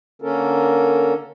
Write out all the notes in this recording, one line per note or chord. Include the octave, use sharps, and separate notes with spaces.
D3 A#3 C#4 A4 A#4